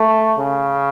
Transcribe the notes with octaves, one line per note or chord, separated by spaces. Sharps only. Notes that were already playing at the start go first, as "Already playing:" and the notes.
Already playing: A3
C#3